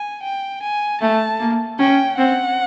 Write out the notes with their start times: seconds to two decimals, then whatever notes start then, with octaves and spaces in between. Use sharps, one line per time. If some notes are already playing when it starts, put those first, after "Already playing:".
Already playing: G#5
0.23 G5
0.62 G#5
1.01 A3 A5
1.40 A#3
1.79 C#4 G5
2.18 C4 F#5